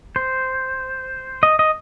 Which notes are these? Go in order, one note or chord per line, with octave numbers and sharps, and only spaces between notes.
C5
D#5
D#5